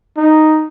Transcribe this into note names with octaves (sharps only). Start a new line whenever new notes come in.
D#4